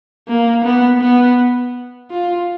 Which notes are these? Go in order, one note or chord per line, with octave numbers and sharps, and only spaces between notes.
A#3
B3
B3
F4